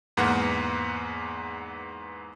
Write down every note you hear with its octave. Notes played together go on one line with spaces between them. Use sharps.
E2 G#2 A#3 B3 F#5